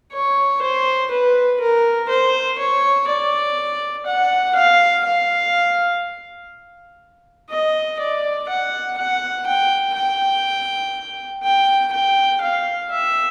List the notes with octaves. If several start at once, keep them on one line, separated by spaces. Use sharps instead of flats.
C#5
C5
B4
A#4
C5
C#5
D5
F#5
F5
F5
D#5
D5
F#5
F#5
G5
G5
G5
G5
F5
E5